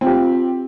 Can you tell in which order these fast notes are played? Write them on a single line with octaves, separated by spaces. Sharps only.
C4 F4 G4